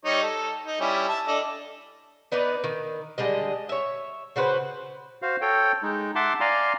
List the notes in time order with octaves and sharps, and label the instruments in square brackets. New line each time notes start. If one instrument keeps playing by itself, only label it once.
[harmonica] G3 D#4 C#5
A4
D#4
G3 C#4 E4
E5 A5
D4 A4 D#5
[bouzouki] B3 D#4 B4 D5
D#3
D3 G3 G#3 D#5
C#5 E5
C#3 F#4 B4 C5
[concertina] F#4 C5 F5
A4 C#5 G5
G#3 D#4
E5 F#5 A5 C6 D6
D5 F5 G#5 A#5 C6